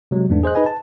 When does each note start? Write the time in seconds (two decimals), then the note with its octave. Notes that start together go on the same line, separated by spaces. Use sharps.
0.11 C3 F#3 G#3
0.29 E2 G#2 A3 B3 D4
0.43 G#4 C5 D#5 F#6
0.55 D#4 G#4 B4 D#5 G#5
0.66 A5